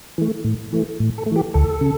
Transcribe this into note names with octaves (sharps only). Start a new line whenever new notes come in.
E3 A3
A2
E3 A3
A2
A4
A3
E3 G4
D2 A4
C#3